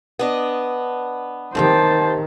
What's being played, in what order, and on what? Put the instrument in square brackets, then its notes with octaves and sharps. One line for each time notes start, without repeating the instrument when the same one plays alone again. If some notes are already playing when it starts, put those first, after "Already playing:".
[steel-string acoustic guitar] B3 D4 D#5
[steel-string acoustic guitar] D#2 C3 G5 [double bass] D#3 [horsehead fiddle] C5 A5